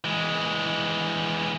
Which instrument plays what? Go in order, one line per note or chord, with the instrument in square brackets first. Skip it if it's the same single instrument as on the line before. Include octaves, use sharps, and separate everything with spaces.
[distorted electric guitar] E3 G#3